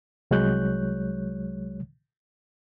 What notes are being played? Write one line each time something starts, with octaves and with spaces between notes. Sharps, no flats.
C2 F#3 G#3 C#5 F#6 G6